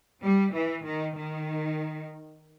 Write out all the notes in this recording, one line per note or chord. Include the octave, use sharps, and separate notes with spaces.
G3
E3
D#3
D#3